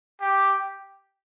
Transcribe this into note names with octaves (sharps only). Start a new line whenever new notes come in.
G4